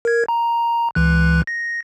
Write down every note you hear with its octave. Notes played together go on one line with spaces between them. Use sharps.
A#4 G#6
A#5
C#2 E3 F#6
A#6